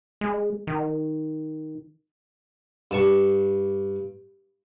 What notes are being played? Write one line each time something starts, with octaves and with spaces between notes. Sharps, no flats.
G#3
D#3
G2 A5 C#6